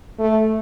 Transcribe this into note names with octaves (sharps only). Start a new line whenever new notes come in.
A3